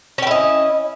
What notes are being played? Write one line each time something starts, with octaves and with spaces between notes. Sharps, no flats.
C#4 E4 G4 D#5